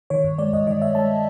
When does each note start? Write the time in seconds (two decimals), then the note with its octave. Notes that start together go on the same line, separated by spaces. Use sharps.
0.10 D#3 C#5
0.24 G2
0.38 G#3 D5
0.53 G2 D#5
0.67 D#3 D#5
0.82 G2 E5
0.95 G#3 A5